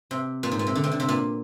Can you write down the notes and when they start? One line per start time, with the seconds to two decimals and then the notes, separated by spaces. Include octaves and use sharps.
0.11 C3
0.43 A#2
0.52 G#2
0.59 A#2
0.67 C3
0.75 D3
0.84 C3
0.92 D3
1.00 C3
1.09 A#2